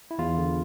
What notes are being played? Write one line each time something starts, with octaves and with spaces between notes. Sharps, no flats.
E4
E2 F4
D3